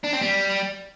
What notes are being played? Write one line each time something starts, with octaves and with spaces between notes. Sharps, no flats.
D4
C4
G3